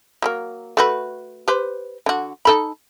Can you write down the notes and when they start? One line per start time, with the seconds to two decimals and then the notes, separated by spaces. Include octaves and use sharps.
0.22 F#3 G3 A#3
0.77 A3 F#4 B4
1.48 G4 B4 C5
2.06 D3 F#4
2.45 D#4 A4 B5